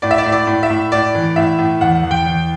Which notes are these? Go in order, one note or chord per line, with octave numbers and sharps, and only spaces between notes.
A2 D5
E5
D5
A2
D5
A2
E5
A2
A2 D5
E3
A2 E5
A2
E2 F#5
E2
G5
E2